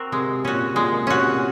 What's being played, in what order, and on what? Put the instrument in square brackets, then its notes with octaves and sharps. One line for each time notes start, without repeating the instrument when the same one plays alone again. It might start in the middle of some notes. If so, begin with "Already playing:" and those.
Already playing: [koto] C4 F#4 A#4
[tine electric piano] C3 [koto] G#3
[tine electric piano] A#2 [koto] C#4 F#4
[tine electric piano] A#2 [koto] G#3
[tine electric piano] C3 [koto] C#4 F#4